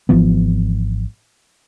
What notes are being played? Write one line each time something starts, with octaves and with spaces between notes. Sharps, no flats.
G#1 E3 F3 B3